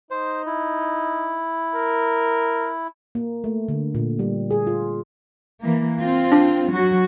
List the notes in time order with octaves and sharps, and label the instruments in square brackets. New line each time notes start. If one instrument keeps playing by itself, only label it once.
[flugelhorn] D#4 [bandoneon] C5
[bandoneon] E4
[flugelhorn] A#4
[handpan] A#3
A3
D3
A#2
G3
G#4
F4
[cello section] E3 A#3
C4 F4
[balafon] D4
[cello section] F#3 F#4